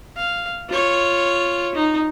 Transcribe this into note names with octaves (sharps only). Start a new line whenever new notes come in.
F5
F4 C#5
D#4